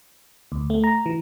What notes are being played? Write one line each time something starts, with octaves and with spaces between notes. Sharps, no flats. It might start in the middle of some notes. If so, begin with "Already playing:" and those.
D2
A3
A#5
E3